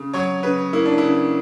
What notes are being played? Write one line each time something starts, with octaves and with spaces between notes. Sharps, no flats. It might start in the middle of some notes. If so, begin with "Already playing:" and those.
Already playing: C#3
F#3 C#5
C#3 B4
A#3 E4
D4
E4
C#3